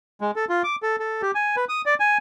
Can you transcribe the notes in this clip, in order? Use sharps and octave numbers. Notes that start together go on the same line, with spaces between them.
G#3
A4
F4
D6
A4
A4
G4
G#5
B4
D#6
D5
G#5